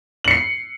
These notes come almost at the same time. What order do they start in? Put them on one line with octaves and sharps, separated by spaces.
F#7 C#7 C7